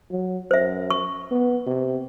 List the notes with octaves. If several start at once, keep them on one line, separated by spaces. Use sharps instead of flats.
F#3
F#2 C5 E5
C#6
B3
C3